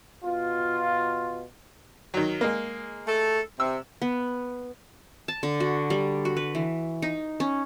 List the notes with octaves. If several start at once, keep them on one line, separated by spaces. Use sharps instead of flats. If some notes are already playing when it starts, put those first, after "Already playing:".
B2 F4
D#3 F#3
G#3 A#3
A3 A4
C3 E6
B3
A5
D3
F#4
G3
F#4
B4
E3
D#4
C#4